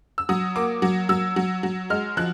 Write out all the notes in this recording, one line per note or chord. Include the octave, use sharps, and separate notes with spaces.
E6
F#3 D#6
A#3 D6
F#3
F#3 E6
F#3
F#3
G#3 F6
F3 F#6